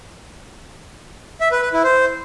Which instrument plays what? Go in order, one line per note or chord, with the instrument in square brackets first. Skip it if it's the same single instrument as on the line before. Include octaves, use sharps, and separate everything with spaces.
[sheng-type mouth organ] E5
B4
B4
E4
C5